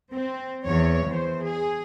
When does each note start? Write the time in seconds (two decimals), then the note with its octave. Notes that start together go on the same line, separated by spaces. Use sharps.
0.12 C4
0.64 E2 E3 C#5
1.06 E2 C5
1.43 G#4